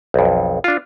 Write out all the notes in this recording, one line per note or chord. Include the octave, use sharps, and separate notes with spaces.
B1 F2
D4 F4